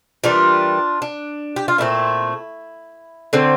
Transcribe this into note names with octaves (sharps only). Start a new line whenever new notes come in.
E3 G3 A#3 D4 F4
D4
G4
F4
A#2 A3 C4 E4
D3 A3 C4